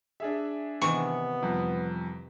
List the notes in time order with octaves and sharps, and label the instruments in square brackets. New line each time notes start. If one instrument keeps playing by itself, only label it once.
[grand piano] D4 G#4 E5
[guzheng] C3 D#3 E3 [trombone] B3 [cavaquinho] C#6
[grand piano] C2 F2